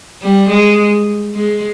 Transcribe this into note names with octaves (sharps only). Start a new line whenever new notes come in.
G3
G#3
G#3